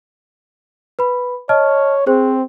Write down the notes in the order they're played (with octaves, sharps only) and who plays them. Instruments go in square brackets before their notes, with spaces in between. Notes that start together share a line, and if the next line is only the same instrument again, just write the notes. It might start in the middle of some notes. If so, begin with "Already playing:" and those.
[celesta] B4 B5
[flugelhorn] C#5 [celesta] D#5 A5 F6
[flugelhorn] C4 [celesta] G#4 C5